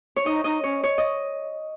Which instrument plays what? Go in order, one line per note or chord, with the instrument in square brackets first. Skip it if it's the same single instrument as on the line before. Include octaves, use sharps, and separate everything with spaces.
[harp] C#5
[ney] D#4 [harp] D#5
[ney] D#4 [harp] D#5
[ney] C#4 [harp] C#5
[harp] C#5
D#5